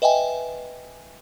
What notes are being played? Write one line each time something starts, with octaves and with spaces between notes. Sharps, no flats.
B4 D#5 E5 G5 G#5